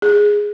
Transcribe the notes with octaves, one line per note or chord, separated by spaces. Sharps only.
G#4